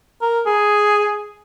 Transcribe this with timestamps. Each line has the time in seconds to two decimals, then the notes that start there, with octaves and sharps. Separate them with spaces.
0.22 A#4
0.46 G#4